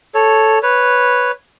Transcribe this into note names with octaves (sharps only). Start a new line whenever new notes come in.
A4 C#5
B4 C#5